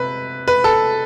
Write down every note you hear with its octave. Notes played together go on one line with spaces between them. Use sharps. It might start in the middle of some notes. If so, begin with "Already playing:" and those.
Already playing: C3 B4
B4
A4